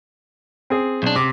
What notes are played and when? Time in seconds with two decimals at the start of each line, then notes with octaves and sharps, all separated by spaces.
0.70 C4 G#4
1.03 B1 D4
1.16 C3 D6